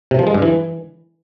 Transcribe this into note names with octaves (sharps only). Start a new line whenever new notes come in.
C3
F3
G#3
G2
E3